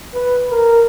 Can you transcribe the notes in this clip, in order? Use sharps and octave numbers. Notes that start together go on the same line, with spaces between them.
B4
A#4